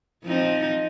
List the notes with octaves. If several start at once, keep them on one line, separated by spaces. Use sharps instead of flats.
F3 C4 D#4